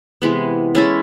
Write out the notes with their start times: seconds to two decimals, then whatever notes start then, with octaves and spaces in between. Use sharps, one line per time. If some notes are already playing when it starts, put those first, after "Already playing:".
0.22 C3 E3 G#3 B3
0.75 G#3 C#4 E4 A4